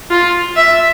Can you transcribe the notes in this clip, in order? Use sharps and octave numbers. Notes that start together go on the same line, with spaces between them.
F4
E5